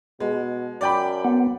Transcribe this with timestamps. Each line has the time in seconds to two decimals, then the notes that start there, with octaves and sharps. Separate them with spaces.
0.20 B2 G#3
0.81 F#2 D5 G5 B5
1.25 B3